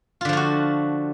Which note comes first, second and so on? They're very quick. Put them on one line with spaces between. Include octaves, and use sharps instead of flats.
F4 D3 F3 A3 F#4